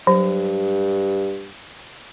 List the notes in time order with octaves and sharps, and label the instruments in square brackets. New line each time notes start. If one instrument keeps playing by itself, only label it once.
[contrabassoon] G2 [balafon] F#3